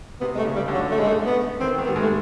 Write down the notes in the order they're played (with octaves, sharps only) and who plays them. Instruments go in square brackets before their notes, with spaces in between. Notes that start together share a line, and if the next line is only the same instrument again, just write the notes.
[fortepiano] C3 [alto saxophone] B3
[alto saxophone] G#3
A3
[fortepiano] C#3
[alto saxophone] G3
[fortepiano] D3
[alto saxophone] F#3
A3
G#3
A3
B3
[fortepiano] D#3 [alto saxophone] C4
[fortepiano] D#3
[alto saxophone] B3
[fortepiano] G3
G#3
[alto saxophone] A3